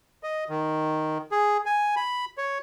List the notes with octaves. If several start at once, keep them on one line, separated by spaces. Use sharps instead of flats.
D#5
D#3
G#4
G#5
B5
C#5